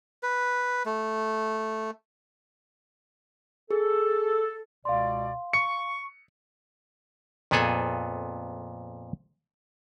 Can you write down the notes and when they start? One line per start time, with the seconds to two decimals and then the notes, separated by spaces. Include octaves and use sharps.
0.23 B4
0.86 A3
3.71 G#4 A4
4.85 C#2 B2 D5 F5 C6
5.53 C#6 C#7
7.51 F2 A#2 B3 G#4 A4 G#5